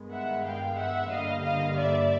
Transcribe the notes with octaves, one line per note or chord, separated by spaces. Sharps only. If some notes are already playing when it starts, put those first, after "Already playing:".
Already playing: G2 D#3 G#3 B3
E5 F#5
F5 G5
E5 F#5
G2 D3 G3 A#3 D#5 F5
D#5 F5
D5 E5